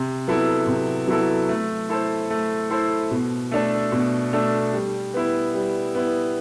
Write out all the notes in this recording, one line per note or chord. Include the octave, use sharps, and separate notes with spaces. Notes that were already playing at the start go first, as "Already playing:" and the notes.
Already playing: C3
F#3 B3 E4 A4
C3
F#3 B3 E4 A4
A3
E4 A4 C5
A3
E4 A4 C5
B2
A3 D4 A4
B2
A3 D4 A4
G3
B3 E4
G3
B3 E4